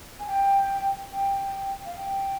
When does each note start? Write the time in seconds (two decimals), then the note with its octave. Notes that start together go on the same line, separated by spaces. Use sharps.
0.19 G#5
0.27 G5
1.12 G5
1.86 F5
1.96 G5